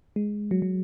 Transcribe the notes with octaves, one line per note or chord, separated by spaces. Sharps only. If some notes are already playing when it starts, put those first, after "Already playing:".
G#3
F#3
F#3